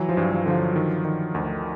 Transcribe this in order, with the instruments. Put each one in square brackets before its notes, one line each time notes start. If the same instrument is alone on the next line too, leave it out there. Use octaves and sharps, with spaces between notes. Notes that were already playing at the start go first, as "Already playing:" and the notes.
Already playing: [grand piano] E3 [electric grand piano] F#3
[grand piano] F3
[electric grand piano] G2
[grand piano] F3
[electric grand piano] D3 [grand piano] F3
[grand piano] F#3
[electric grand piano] D#3
D#3
D2